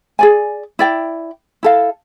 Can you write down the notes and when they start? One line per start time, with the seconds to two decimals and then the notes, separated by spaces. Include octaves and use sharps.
0.19 G#4 D5 G#5
0.79 E4 D5 G5
1.63 E4 A4 F5